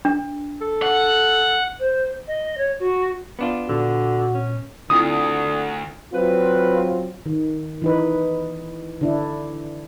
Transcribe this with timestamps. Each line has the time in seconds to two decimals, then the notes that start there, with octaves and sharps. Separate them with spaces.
0.05 D4
0.61 A4
0.82 F#5
1.79 C5
2.27 D#5
2.57 C#5
2.79 F#4
3.39 B3 D4 F4
3.69 A#2 D3 F#4
4.34 C#4
4.90 D2 D3 C4 E4 F4 D#6
6.14 F#3 C4 F4 B4
7.26 D#3
7.82 E3 D#4 B4
9.01 D3 D4 E4